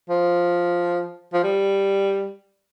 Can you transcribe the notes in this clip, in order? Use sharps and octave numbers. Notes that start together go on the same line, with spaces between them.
F3
F3
G3